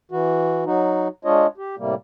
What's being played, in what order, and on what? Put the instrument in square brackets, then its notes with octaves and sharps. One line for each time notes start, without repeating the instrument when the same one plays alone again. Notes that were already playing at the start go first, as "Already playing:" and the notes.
[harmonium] E3 F#4
F#3 D#4 F#4
G#3 D4 F4 C#5 D#5
G4
A2 C3 G3 A#3